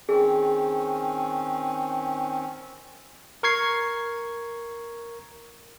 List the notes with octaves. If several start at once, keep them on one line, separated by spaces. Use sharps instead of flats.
D#3 C4 C#4 G#4
A#4 C#6 G#6 C7